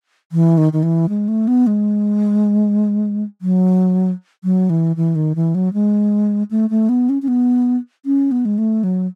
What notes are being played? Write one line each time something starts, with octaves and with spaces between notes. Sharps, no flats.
E3
D#3
D#3
E3
G#3
A3
B3
G#3
F#3
F#3
E3
E3
D#3
E3
F#3
G#3
A3
A3
B3
C#4
C#4
B3
C#4
B3
G#3
A3
F#3